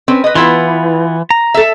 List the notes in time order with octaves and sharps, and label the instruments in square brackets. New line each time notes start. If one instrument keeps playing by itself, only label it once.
[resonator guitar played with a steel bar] C4 C#4 B4
B4 D#5
[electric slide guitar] E3 [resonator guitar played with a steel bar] B3 E4 F4
[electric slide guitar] A#5
[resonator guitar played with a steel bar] A4 E5